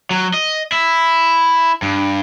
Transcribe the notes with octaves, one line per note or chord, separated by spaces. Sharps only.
F#3
D#5
E4
G2